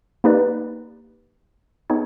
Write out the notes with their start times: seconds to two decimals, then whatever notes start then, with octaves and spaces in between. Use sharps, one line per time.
0.24 A#3 D#4 G4 B4 D5
1.90 B3 D#4 G#4 C#5